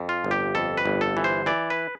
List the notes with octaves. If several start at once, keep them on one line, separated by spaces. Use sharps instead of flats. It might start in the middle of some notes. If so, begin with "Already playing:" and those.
Already playing: F2
F4
G1
G4
F2 A4
B4
G1
A4
E3
C5
E3 D5
B4